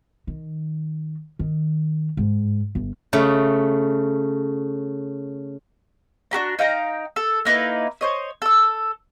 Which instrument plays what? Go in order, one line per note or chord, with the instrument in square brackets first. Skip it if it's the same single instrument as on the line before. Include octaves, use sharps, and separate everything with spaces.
[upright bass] D#3
D#3
G#2
G1
[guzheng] C#3 A3
[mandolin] D4 F#4 G4 A#5
D#4 F5 G5 A#5
A4
A#3 D#4 E4 B4
C5 C#5 D#5
A4 E6